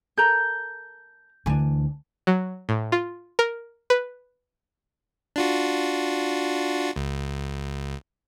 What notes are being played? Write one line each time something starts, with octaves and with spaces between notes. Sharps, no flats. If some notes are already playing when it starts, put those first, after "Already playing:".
A4 A#4 A#5 G6
D2 E3 D4 G#5
F#3
A2
F4
A#4
B4
D4 F4 F#4
C#2